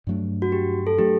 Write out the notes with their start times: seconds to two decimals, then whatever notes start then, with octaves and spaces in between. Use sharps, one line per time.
0.07 G2 F#3 A3 D4
0.42 F#4
0.52 G4
0.87 A4
0.98 F#3 A3 D4 G4